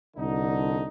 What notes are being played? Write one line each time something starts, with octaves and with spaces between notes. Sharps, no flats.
C2 D3 D#4